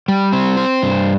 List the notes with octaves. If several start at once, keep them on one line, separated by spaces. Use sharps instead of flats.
G3
C4
C5
G2